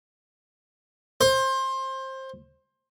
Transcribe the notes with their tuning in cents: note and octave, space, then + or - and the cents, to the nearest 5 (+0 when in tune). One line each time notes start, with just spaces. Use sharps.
C5 +20